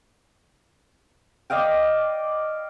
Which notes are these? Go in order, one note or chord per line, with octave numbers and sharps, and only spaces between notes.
D5 D#5 F5 G5